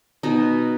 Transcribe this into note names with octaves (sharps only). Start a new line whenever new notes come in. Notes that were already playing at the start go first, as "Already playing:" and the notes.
B2 D#4